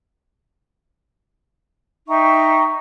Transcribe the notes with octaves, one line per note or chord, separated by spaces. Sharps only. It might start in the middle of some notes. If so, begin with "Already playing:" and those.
D#4 E5 G5 C#6